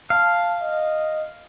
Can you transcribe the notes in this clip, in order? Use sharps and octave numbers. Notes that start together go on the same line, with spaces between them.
F5 A5
D#5